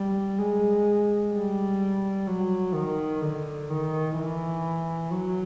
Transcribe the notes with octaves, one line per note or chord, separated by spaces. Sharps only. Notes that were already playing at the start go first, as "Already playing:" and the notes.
Already playing: G3
G#3
G3
F#3
D#3
D3
D#3
E3
F#3